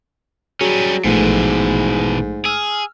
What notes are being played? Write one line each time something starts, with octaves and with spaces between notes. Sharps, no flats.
F#3 G3 C#4 G#4
A#1 G#2 B2 E3 F3 A3
G#4 E6 F6